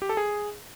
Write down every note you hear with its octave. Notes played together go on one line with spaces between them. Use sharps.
G4
A4
G#4